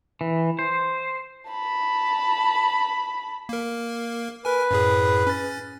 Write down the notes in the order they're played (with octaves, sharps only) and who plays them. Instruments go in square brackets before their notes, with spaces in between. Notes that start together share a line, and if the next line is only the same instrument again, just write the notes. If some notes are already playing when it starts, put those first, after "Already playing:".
[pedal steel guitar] E3
C5
[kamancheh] A5 B5
[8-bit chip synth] A#3 A#4
[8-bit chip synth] A#4 G#5 [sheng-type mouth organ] B4
[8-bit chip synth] F#2 A2 G#4
C#4 A6